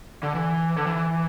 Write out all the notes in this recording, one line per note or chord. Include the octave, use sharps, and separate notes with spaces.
D3
E3
D3
E3